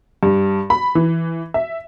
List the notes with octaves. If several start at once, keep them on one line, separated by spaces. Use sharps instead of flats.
G2
B5
E3
E5